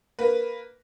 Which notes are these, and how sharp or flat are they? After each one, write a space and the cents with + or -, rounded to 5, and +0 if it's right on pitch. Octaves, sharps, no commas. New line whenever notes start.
A#3 +0 B4 +0